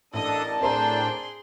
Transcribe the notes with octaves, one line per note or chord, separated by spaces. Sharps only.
A1 D4 A4 A#4 D5 D#5 A5 D#6
A2 C4 D4 G#4 C5 G5 A#5 C6